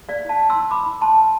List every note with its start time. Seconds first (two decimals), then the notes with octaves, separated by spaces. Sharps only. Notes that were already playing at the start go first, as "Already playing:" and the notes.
0.09 B4 D5 F5
0.25 E4 F5 A5
0.40 B4
0.50 E4 C6 E6
0.71 B4 B5 D6
0.86 E4
1.02 B4 A5 C6
1.18 B4